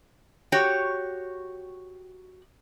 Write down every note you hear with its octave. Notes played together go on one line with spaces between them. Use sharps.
F#4 G4 C#5 G5